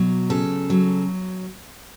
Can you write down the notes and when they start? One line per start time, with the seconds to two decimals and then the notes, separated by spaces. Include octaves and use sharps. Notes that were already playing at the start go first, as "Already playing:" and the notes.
Already playing: B2 F#3
0.30 C#3 A4
0.70 F#3